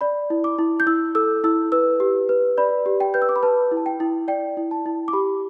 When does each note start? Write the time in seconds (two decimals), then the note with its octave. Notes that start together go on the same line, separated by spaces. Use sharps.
0.01 D5 B5
0.30 E4
0.44 D6
0.58 E4
0.80 G6
0.87 E4 E6
1.15 A4 E6
1.44 E4 E6
1.72 B4 E6
2.00 G4
2.29 B4
2.58 D5 B5
2.86 G4
3.00 G5
3.14 B4 G6
3.22 E6
3.29 D6
3.36 B5
3.43 B4 A5
3.71 E4
3.77 A5
3.86 G5
4.00 E4
4.28 D5 G5
4.57 E4
4.71 A5
4.86 E4
5.08 D6
5.13 G4 B5